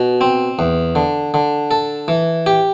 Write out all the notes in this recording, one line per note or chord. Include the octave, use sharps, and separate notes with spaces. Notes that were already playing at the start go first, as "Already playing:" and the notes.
Already playing: B2
C4
E2
D3
D3
A4
E3
G4